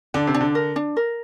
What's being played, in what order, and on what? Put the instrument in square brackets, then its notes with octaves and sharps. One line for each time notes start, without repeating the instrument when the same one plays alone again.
[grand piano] D3 [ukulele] D4
[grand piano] C3
[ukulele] D4
[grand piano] D3
[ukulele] A#4
D4
A#4